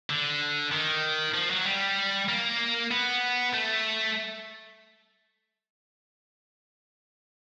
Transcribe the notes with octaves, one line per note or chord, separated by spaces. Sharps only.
D3
D#3
F3
F#3
G3
A#3
B3
A3